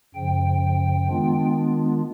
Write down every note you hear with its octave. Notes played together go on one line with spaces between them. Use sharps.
F#2 C#3 F3 G5
D#3 G#3 B3 D4 F4